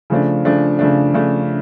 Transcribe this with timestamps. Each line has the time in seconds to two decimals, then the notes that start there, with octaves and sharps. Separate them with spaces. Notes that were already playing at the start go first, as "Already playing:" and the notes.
0.10 C#3 F3 A3 D4
0.45 C#3 F3 A3 D4
0.79 C#3 F3 A3 D4
1.14 C#3 F3 A3 D4